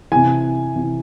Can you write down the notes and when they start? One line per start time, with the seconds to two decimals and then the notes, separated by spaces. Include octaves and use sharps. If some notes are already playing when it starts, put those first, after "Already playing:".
0.12 C3 E3 G#5
0.75 C3 E3